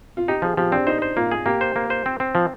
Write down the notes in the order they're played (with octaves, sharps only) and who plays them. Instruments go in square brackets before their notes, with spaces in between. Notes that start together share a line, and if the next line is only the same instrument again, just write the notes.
[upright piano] F4
[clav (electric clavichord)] D#4 [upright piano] G4
[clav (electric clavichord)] F3 [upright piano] G#4
[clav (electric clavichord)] F3 [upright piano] G4
[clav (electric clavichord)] C4 [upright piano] D4
[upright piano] D#4 [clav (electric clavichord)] C5
[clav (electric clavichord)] C5
[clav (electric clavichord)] A#3 [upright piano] F4
[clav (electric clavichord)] G#4
[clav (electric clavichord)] A#3 [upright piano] G4
[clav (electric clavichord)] C5
A#3
C5
C4
C4
F3